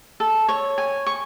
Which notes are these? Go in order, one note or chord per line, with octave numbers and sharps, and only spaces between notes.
A4
C#5
G#5
C#6